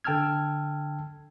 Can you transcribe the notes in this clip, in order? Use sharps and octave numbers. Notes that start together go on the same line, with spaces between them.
D3 G5 A5 E6 F6 G#6